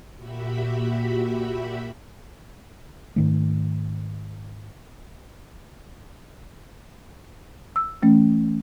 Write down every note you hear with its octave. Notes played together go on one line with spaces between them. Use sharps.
A#2 F#4 G4 E5 B5
G#2 D#3 A3
E6
E3 A3 C#4